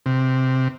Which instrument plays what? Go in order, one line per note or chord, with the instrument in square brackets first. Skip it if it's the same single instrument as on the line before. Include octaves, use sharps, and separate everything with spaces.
[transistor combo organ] C3